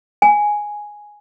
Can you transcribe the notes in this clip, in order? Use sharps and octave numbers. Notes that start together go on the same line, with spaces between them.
G#5